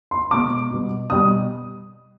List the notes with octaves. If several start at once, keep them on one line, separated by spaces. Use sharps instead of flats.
C6
B2 G#3 B3 D6
B2 G3 B3
B2 G3 D#6